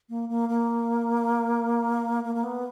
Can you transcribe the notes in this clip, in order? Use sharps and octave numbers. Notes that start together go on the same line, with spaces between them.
A#3
A#3
A#3
A#3
A#3
B3